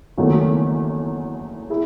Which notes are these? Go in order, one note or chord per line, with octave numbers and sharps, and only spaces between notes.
F#1 E2 D#3 F#3 A3
E4 G#4